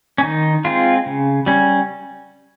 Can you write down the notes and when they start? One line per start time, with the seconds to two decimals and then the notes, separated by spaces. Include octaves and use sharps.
0.18 C#4
0.23 D#3 D#4
0.65 G#3 C4 F4
1.06 C#3
1.46 G3 C#4